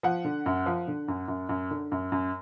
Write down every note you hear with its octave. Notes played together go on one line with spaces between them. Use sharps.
F3 F#5
D3
F#2
F3
D3
F#2
F#2
F#2
D3
F#2
F#2